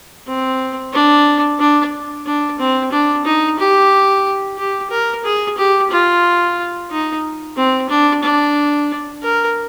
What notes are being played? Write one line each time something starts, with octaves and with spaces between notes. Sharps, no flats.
C4
D4
D4
D4
C4
D4
D#4
G4
G4
A#4
G#4
G4
F4
D#4
C4
D4
D4
A#4